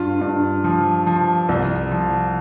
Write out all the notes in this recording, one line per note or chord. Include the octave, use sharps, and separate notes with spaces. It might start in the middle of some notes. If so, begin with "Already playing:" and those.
Already playing: G2 F4
G2
F3
F3
C2
F3